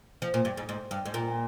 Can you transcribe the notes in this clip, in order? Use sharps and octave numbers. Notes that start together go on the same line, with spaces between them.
F3
A#2
G2
G#2
G#2
G2
G#2
A#2